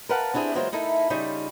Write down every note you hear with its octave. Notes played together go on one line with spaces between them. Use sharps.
A#4 B4 F5 F#5 A5
C4 D4 E4 G4 G#4
E3 F#3 G#3 A#3 F4 C5
A3 D#4 E4 A4 A#4
C#3 G3 D#4 F4